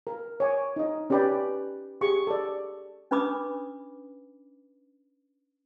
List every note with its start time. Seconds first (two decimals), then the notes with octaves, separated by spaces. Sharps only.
0.07 A#4
0.40 C#5 G#5 D6
0.76 D#4 D#5
1.10 C#4 G4 B4 D5 G5 B5
2.01 G4 G#4 C#6
2.27 A4 D5
3.11 C#4 D4 B4 B5 D6 D#6